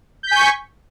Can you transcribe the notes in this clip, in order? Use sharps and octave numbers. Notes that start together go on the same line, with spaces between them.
G#5 C#6 G6 B6